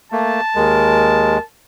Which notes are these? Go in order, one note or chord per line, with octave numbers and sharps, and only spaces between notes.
A3 A#3 A5
D#2 G#3 A#4